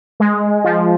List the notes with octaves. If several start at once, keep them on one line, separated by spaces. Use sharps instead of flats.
G#3
F3